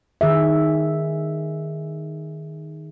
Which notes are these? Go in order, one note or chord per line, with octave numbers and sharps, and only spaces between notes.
D#3 G#4 E5